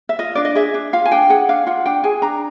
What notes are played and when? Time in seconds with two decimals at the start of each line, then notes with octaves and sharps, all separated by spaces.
0.09 E5
0.19 F4 D#5
0.35 D4 D5
0.45 D#5
0.55 G#4 E5
0.74 D4
0.93 F4 F5
1.05 G#5
1.12 D4 G5
1.29 G#4 F#5
1.49 D4 F5
1.66 F4 F#5
1.86 D4 G5
2.04 G#4 G#5
2.22 D4 A#5